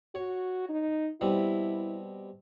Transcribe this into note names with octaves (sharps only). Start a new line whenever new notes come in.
F#4 C#5
D#4
B2 G3 C4 E4